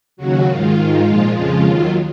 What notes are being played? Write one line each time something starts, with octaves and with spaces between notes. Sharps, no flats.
D#2 C#3 F#3 F#4
G#2 D#3 G#3 F4
G#2 D#3 G#3
A#2 F3 G#3
F2 C#3 F3 G#3 F4
D#2 D#3 F#3